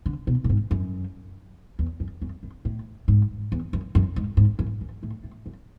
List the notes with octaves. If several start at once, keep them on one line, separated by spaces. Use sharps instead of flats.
D3
B2
A2
G#2
F#2
E2
F#2
F#2
F#2
A2
G#2
E2
F#2
F#2
G#2
G#2
F#2
F#2
A2
A2
F#2